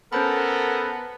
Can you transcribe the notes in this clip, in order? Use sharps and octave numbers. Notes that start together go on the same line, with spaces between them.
B3 C#4 A4 A#4 C5 B5